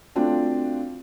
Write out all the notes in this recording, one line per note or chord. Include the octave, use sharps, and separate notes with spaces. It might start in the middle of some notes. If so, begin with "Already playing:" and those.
A3 C4 D4 F4 F#4